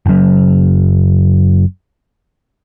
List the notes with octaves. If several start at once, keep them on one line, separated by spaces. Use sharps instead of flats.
F#1 F#2